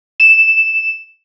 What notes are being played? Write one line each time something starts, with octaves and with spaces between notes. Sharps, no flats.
E7